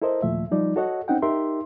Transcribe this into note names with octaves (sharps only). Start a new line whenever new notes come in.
E4 A4 A#4 C5 D#5
D#2 A#2 F3 A3 E5
F3 G3 D#4 D5
F#4 A4 C#5 D#5 F#5
C4 C#4 D#4 F#5 G5
D#4 G4 A#4 E5 C6